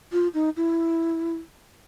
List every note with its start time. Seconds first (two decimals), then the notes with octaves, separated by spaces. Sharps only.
0.12 F4
0.34 D#4
0.57 E4